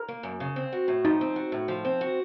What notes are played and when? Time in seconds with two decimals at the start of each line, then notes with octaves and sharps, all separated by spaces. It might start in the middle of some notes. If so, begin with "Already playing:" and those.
Already playing: A#4
0.08 A#3
0.23 F#2
0.40 C#3
0.56 C4
0.73 F#4
0.88 A2
1.05 F3 D#4
1.21 C4
1.36 F#4
1.52 A2
1.68 F3
1.85 C4
2.01 F#4